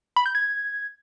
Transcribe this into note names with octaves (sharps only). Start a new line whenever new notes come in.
B5
G6
G#6